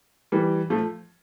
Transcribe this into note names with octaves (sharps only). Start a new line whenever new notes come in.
E3 G3
F3 A3